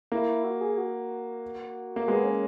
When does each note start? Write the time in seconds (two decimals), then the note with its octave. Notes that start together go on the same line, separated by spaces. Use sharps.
0.12 A#3 E4
0.27 E4
0.44 F#4
0.61 G#4
0.78 F#4
1.96 A#3
2.08 G#3 B3
2.24 C#4